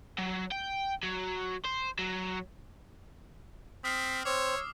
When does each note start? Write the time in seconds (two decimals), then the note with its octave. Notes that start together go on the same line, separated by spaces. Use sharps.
0.19 F#3
0.51 G5
1.04 F#3
1.65 C5
1.99 F#3
3.84 C4 D#6 F6 B6 C7
4.25 C4 C#5 D6 E6